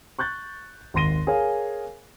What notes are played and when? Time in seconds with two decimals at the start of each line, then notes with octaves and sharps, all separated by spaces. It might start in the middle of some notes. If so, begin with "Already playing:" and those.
0.19 C#6 F#6 G6 A6
0.94 G#1 D#2 C6 A#6 D#7 G7
1.27 G#4 A#4 C#5 F5 G#5